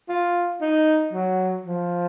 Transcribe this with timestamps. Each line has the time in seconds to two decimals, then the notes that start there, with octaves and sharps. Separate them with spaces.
0.09 F4
0.61 D#4
1.13 F#3
1.66 F3